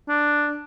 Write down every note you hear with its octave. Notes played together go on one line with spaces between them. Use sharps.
D4